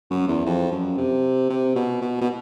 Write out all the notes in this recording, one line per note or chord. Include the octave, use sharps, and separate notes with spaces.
F#2
E2
F2
F#2
C3
C3
B2
B2
B2